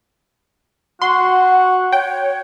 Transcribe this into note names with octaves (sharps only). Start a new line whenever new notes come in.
F#4 F#5 C6
C#5 G5